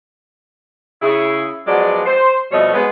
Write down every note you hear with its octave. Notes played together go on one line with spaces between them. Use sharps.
C#3 E4 G#4
F3 F#3 G#3 B3 D5
C5
F2 B2 G3 A3 C#5 D#5
G#3 B3